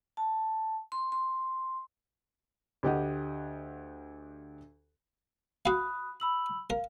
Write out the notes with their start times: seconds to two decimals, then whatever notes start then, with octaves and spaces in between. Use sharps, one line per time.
0.17 A5
0.92 C6
1.12 C6
2.83 D2 G4 D#5 F#5
5.66 F#4 F5 B5 D#6 F#6
6.20 B5 E6 F#7
6.70 A#4 F5